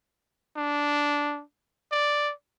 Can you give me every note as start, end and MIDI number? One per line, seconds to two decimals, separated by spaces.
0.56 1.42 62
1.91 2.32 74